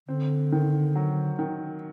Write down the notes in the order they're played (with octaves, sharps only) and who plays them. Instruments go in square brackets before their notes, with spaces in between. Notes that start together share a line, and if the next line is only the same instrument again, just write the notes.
[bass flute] D3 [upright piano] C4
[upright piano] D#3
F#3
D#3